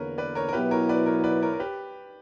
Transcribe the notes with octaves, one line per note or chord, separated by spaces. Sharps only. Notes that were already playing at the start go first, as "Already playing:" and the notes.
Already playing: E2 D3 A#3 A#4 B4 C#5
B4 D5
A#4 C#5
A#4
B2 F#3 B3 E4 G4 B4
A#4 C#5
B4 D5
A#4 C#5
B4 D5
A#4 C#5
A#4
G4 B4